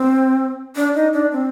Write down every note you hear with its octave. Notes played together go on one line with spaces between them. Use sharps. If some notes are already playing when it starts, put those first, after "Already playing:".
Already playing: C4
D4
D#4
D4
C4